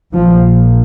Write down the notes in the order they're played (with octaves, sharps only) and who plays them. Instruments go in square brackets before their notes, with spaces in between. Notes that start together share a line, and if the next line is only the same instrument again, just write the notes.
[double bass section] A#1 A#2 F3